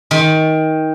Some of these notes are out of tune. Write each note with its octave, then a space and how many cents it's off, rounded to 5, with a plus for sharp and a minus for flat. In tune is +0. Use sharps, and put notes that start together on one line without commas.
D#3 +20